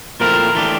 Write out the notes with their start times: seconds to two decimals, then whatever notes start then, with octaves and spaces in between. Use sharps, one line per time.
0.20 A#2 F3 A3 C4 E4 A#4
0.55 E3 A3 D4 G4